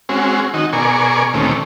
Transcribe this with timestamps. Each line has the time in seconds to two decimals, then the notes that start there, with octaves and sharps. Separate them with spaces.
0.09 G#3 C4 C#4 F#4 G#4
0.54 D#3 D#4 F#4
0.73 B2 G#4 A#4 D5 G#5 C#6
1.34 D2 A#2 D#3 A3 C4 C#4